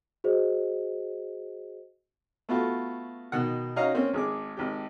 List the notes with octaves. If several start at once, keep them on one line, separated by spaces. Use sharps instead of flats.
F#4 G#4 C5 D#5
A3 B3 F4 F#4
B2 D#3 F#5
C#4 D#4 F#4 D#5 F5 A#5
A#3 C4 C#4
G#1 G#4 D6
G#1 G4